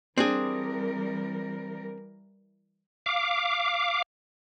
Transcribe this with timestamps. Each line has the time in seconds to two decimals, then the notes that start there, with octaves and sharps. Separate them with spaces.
0.18 E3 G3 C4 D4 G#4 A#4
3.06 F5 D6